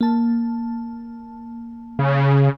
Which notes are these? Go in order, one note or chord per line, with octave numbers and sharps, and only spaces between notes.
A#3 A5
C#3